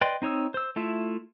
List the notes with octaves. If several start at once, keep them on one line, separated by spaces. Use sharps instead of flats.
B4 D5 D#5 G5 C6
C4 D#4 C#5 D#6 E6
C5 E6
A3 E4 F4 E5